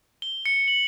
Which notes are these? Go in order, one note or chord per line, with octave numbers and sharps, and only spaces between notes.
G7
C#7
F#7